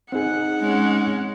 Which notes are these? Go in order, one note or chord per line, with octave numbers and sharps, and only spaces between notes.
C4 D#4 G#4 F#5
G#3 C#4